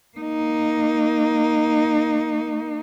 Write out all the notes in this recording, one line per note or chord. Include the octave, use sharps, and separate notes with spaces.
A#3 D#4